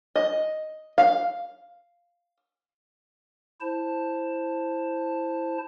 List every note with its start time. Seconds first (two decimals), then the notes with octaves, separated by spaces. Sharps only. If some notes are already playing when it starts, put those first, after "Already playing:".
0.16 D#5
0.98 F5
3.61 E4 C5 A5